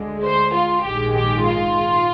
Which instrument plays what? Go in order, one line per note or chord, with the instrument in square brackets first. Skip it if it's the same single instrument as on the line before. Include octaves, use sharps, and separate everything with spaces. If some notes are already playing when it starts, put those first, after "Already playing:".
Already playing: [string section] D2 D3 G#3
C5
F4
A#1 G#2 D#3 G#3 G4
G4
F4